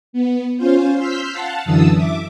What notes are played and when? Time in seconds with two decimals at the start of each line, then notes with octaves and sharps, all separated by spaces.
0.13 B3
0.57 C#4 F4 C5
0.96 C6 E6 F6 G6 B6
1.31 F5 F#5 A5
1.65 F#2 D3 E3 A5 D#6 E6
1.94 E5 D6